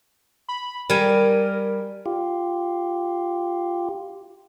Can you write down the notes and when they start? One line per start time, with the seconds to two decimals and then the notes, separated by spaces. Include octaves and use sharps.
0.48 B5
0.90 G3 A#4 G#5
2.06 F4 G4